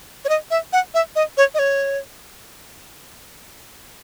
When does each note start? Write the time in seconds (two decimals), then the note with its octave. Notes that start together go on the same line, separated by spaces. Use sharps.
0.25 C#5
0.29 D#5
0.51 E5
0.73 F#5
0.94 E5
1.16 D#5
1.37 C#5
1.54 D#5
1.59 C#5